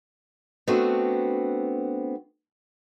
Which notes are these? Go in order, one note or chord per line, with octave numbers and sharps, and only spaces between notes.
A3 B3 C4 D4 F#4